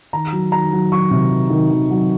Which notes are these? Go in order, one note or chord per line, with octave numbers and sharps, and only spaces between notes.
D#3 A#5
F#3
D#3 A#5
F#3
F#3 C#6
C3
D#3
D#3
D#3
F#3